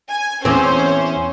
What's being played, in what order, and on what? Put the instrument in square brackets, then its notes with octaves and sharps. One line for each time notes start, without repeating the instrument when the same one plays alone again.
[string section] G#5
[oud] E2 C4 [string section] C#4 C5